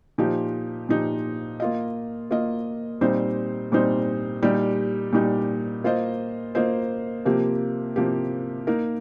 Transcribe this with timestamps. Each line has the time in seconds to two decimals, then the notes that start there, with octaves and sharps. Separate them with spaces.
0.18 A#2 F3 D#4 G4
0.89 A#2 F3 D#4 G4
1.60 A#3 F4 D#5
2.31 A#3 F4 D#5
3.01 A#2 G3 C4 D#4 C5
3.72 A#2 G3 C4 D#4 C5
4.43 A#2 G3 D#4 G4
5.13 A#2 G3 D#4 G4
5.84 A#3 F4 C5 D#5
6.55 A#3 F4 C5 D#5
7.25 C3 F3 A#3 G4
7.96 C3 F3 A#3 G4
8.67 A#3 D#4 A#4